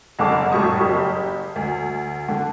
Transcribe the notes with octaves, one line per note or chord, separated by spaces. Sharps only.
F#1 D3 A5 D6
F1 A2 G3 C#6 D#6
F#1 G4
D2
D3